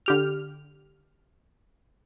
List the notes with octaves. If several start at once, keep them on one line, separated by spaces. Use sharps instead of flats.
D3 G4 F6